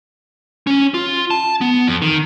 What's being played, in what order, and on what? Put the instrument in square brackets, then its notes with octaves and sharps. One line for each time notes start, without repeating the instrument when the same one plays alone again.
[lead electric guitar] C#4
F4
A5
B3
F2
D#3